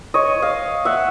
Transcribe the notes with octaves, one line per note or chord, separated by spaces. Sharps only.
C#5 D#5
D#5 F5
E5 F#5